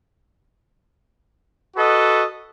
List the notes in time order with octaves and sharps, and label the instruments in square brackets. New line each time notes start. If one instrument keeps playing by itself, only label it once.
[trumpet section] F#4 A4 B4 D#5